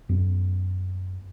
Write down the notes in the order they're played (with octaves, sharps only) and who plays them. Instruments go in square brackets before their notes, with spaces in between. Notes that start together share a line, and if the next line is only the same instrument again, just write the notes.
[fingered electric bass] F#2 B3